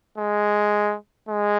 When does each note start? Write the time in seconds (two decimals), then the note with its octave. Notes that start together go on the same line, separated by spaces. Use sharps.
0.18 G#3
1.29 G#3